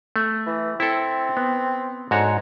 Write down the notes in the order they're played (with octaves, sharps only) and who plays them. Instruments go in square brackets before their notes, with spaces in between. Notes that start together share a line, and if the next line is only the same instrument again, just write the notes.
[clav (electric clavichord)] A3
[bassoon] E3
[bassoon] C4 [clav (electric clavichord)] E4 A4
[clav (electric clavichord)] B3
[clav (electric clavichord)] G#2 F#4 C#5 [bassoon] D3